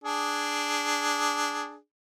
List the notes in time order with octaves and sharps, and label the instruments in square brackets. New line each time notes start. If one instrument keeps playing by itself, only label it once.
[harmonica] D4 G#4